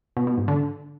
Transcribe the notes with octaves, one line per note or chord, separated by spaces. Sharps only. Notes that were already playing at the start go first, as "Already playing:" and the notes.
B2
B2
G#2
D3